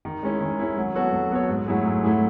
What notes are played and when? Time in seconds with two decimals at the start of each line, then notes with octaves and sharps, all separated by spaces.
0.05 D#3
0.23 G#3 C#4 E4
0.41 D#3
0.59 G#3 C#4 E4
0.77 F#3
0.95 B3 F#4 A4 C#5
1.13 F#3
1.31 B3 F#4 A4 C#5
1.49 G#2
1.67 F#3 A3 E4 G#4
1.85 G#2
2.03 F#3 A3 E4 G#4